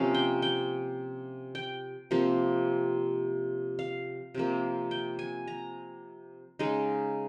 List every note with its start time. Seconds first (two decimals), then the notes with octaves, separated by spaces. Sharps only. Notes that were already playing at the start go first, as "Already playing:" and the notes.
Already playing: C3 F3 A#3 C#4 F5
0.14 G5
0.42 G5
1.55 G5
2.11 C3 F3 A#3
3.79 F5
4.35 C3 F3 A#3
4.91 G5
5.19 G#5
5.48 A#5
6.59 C#3 G#3 D#4